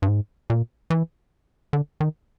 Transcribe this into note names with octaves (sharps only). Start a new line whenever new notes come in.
G2
G#2
A#2
E3
D3
D#3